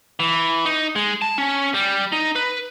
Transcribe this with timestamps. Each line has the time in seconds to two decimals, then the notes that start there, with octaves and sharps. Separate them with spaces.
0.20 E3
0.65 D#4
0.96 G#3
1.22 A5
1.38 C#4
1.74 G3
2.12 D#4
2.35 B4